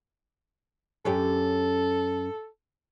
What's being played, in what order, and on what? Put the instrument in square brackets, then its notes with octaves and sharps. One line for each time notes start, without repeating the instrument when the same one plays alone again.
[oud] F#2 C#4 G4 [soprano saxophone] A4